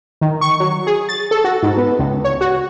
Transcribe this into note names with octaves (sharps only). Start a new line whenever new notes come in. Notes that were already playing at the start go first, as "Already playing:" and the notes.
D#3
C#6
F#3
G#4
A6
A4
F#4
G#2
B3
C#2
C#5
F#4